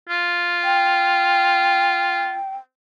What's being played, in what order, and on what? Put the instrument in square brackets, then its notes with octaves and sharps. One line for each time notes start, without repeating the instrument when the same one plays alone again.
[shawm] F4
[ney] G5